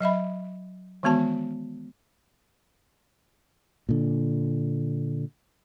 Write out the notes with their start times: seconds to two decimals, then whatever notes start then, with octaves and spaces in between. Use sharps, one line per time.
0.01 F#3 D#5 E5 B5
1.03 D#3 E3 G#3 B3 F#4 A5
3.89 A#2 D3